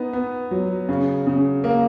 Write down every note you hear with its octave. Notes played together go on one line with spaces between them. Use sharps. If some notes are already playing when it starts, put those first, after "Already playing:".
Already playing: B3 D#4
B3
F#3
C#3
C#3
A#3